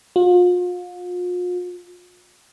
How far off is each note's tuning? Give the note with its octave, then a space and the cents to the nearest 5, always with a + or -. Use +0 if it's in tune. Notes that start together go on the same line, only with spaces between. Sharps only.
F4 +40